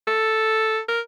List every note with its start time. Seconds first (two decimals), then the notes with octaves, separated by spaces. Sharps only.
0.07 A4
0.88 A#4